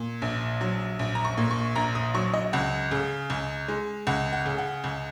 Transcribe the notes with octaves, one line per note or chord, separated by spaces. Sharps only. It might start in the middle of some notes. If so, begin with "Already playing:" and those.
Already playing: A#2
A#1
F#3
A#1
A#5
C#6
A#2
C#6
A#1 A#5
D#6
F#3 C#6
D#5
C#2 F#5
C#3
C#2
G#3
C#2 F#5
F#5
C#3
F#5
C#2